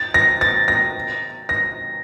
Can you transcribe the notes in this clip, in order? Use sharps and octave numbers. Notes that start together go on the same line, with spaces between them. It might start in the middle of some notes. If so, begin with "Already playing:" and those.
Already playing: A6
A#6
A6
A#6
A#6